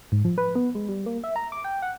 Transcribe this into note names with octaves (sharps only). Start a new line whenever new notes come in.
G#2
F3
B4
B3
G#3
G3
A#3
E5
A#5
D6
G5
F#5